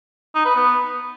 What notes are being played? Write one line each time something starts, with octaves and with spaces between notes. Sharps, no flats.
D#4
B4
B3